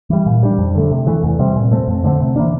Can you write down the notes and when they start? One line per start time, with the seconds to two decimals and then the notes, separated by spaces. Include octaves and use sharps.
0.10 E3 G3
0.26 A#2
0.43 G3 D4
0.58 F2
0.75 D3 A3
0.91 C3
1.07 E3 A3
1.23 E2
1.39 C3 G3 C4
1.56 A#2
1.72 A3 C4
1.88 F2
2.04 D3 A3 C4
2.20 C3
2.36 E3 A#3 D4